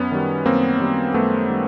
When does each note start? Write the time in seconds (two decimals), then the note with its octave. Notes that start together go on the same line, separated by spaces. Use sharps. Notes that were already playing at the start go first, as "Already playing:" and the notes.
Already playing: F#2 B3 C#4
0.12 D#3 G3
0.45 F#2 A#3 C4
0.80 D#3 G3
1.14 F#2 A3 B3
1.49 D#3 G3